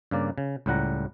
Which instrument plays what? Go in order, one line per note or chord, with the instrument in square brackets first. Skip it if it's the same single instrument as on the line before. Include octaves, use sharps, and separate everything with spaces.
[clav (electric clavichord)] G2 C#3 A#3 D5
C#3
C#2 A2 G3 F#5 A#5